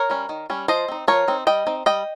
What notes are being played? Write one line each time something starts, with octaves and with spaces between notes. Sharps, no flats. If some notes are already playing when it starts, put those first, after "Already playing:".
Already playing: A#4 C#5
G3 C#4
D#3
G3 C#4
F3 C5 D#5
C4 D#4
F3 A#4 C#5
C4 D#4
G3 D#5 G5
C4 D#4
G3 D#5 G5